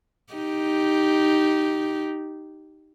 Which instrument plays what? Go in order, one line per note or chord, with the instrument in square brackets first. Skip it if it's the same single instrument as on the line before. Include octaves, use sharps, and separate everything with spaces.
[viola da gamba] D#4 G4